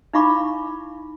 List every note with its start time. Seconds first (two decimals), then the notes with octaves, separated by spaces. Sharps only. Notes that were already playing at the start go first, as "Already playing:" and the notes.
0.13 D#4 E4 F5 B5 C#6 D6